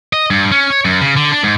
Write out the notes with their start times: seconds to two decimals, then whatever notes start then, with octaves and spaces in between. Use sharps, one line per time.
0.13 D#5
0.31 G2
0.52 C#4
0.70 C#5
0.85 F#2
1.01 C#3
1.17 D3
1.32 D4
1.44 G#2